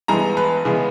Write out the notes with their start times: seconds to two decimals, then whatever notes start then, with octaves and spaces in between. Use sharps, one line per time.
0.08 G2 E3 G#3 B3 A#5
0.37 B4
0.65 C#3 E3 G#3 B3